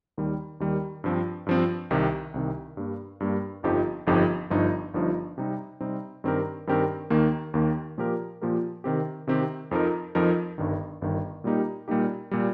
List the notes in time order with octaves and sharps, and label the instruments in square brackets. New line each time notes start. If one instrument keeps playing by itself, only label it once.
[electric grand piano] D#2 D#3 G3
D#2 D#3 G3
G2 F3 C4
G2 F3 C4
C2 C3 D#3
C2 C3 D#3
G2 G3 A#3
G2 G3 A#3
G1 F2 F3 D#4 G4
G1 F2 F3 D#4 G4
G1 G2 F3 D#4
G1 G2 F3 D#4
C3 G3 C4 D#4
C3 G3 C4 D#4
G2 D#3 C4 G4 A#4
G2 D#3 C4 G4 A#4
D#2 D#3 A#3
D#2 D#3 A#3
A#2 F3 A#3 G4 A#4
A#2 F3 A#3 G4 A#4
C3 D#3 C4 G4
C3 D#3 C4 G4
F2 F3 D#4 A#4
F2 F3 D#4 A#4
G1 G2 D#3
G1 G2 D#3
A#2 G3 A#3 D#4 G4
A#2 G3 A#3 D#4 G4
A#2 G3